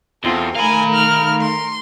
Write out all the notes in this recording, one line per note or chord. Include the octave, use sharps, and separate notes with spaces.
E2 C4 F4 A4
D#3 A3 A#4 F5 G#5 B5
F6
C6